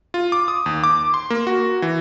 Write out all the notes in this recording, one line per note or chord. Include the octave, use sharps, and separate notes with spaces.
F4
D6
D#6
D#2
D6
C6
A#3
F#4
E3